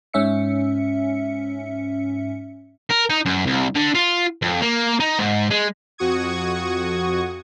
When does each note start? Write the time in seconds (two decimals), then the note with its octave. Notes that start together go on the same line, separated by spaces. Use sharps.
0.14 G#2 C#4 E5 C#7
2.90 A#4
3.10 D#4
3.26 F#2
3.46 C2
3.75 D3
3.95 F4
4.42 F2
4.62 A#3
5.00 D#4
5.19 G#2
5.50 G#3
5.98 F2 F#4 C#6 D#6 G#6